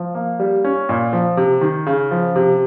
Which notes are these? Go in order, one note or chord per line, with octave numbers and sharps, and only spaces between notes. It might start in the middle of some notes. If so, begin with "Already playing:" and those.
Already playing: F3
A#3
G3
C#4
A#2
F3
C3
D#3
C#3
F3
C3